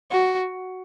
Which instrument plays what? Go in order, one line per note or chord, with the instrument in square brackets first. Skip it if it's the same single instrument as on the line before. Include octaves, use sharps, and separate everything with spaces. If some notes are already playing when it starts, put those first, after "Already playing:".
[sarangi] F#4